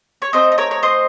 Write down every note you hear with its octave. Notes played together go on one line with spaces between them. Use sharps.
C#5
A3 C4 D#4 C5 D#5
D#5
A#4 C#5
C#5
C5 D#5